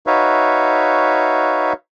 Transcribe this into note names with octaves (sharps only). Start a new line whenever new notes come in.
D#4 F#4 B4 C#5 E5 F5